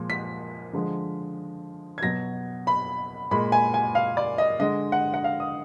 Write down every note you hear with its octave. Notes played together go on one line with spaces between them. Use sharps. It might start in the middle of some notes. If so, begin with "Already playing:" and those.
Already playing: A#2 F3 G#3
B6
D3 F3 G#3
G#6
B2 F#3 A#6
B5
A#2 G#3 B5
G#5
G#5
F5
D5
D#5
D3 G#3 D#5
F#5
F#5
F5
D#6